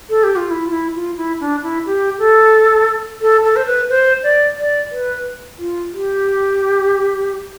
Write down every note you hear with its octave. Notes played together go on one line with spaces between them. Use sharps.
A4
G4
F4
E4
F4
E4
F4
E4
D4
E4
G4
A4
A4
A4
C5
B4
C5
D5
D5
B4
F4
G4